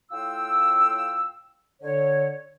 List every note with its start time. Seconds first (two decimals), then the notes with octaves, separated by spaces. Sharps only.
0.12 A2 F4 F5 G5 E6
1.82 D3 C#5